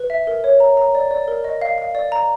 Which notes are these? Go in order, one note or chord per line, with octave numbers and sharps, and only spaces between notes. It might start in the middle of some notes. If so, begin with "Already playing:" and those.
Already playing: B4
E5
A#4
C#5
A#5
A#5
D5
D5
A#4
D#5
F5
F5
D5
A#5